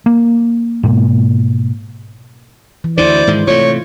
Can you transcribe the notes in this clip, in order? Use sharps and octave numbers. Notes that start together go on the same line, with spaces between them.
A#3
G#2 B2 A#3
E3
D2 D3 E4 C5 D5
G#2 D#3 G#3
C3 A3 F4 C#5